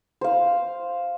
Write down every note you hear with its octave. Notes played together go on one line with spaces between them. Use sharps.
C5 F5